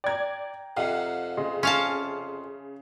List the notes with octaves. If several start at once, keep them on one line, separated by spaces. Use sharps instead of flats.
D5 G5 A#5 G#6
F2 C3 F5 F#5
C#3 D#5 C6
C#4 F5 A5 C6